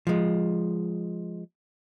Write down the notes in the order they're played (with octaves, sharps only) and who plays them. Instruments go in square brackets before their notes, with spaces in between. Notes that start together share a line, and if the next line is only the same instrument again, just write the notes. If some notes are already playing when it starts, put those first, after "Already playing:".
[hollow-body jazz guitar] F3 G#3